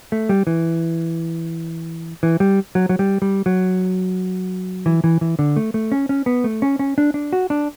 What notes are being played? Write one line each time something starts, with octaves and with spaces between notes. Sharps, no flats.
A3
G3
E3
E3
G3
F#3
F#3
G3
G3
F#3
E3
E3
E3
D3
A3
A3
C#4
C#4
B3
A3
C#4
C#4
D4
D4
F#4
D4